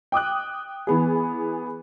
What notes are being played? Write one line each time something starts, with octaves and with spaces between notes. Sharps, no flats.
G5 D6 D#6 F#6
E3 B3 G#4